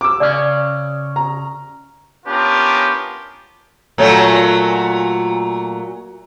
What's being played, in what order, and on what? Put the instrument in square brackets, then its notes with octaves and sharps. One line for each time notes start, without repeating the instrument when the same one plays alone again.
[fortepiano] D6 E6
[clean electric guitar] C#3 C#4 [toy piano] D5
[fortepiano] A#5
[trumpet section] B3 C#4 D4 F4 G4 A#4
[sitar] A#2 F#3 A3